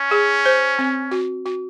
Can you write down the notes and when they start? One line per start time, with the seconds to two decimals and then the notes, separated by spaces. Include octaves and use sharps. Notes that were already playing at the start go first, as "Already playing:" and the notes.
Already playing: C#4
0.11 G#4
0.46 C5
0.79 C4
1.11 F#4
1.46 F#4